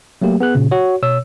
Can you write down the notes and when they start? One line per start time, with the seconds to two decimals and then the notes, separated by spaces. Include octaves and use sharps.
0.22 F#3 A3 A#3 G4
0.40 B3 G#4 F#6
0.55 A#2 C#3
0.71 F#4 C#5
1.03 B2 C#5 E6